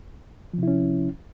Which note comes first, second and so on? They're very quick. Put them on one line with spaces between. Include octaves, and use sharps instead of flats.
F3 C3 E4 C#4